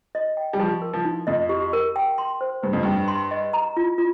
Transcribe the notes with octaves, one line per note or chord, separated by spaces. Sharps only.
D#5
G5
G3
F3 G4
A#4
F3
D#4
F2 D#5
G4
A#4
G5
C6
C5
G2 C5
F2
G2 G5
C6
D#5
A#5
F4
F4